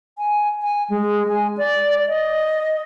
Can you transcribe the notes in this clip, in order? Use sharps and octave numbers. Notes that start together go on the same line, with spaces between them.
G#5
G#5
G#3
G#5
D5
D#5